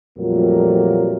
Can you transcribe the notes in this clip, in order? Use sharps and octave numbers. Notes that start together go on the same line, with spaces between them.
F2 A#2 F#3 G3 A3 A#3